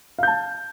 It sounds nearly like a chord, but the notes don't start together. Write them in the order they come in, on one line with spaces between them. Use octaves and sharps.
F5 G6 A5